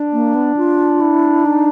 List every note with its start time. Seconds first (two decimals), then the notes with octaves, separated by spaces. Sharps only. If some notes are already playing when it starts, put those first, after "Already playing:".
Already playing: D4
0.13 A#3
0.35 B3
0.57 F4
1.01 E4
1.45 D#4